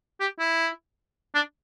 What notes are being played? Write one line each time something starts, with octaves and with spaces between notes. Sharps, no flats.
G4
E4
D4